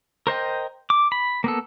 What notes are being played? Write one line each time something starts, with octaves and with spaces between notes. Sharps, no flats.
A#4 C5 D#5 G5
D6
B5
A#3 B3 A4